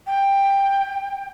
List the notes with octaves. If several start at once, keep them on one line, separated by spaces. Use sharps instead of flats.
G5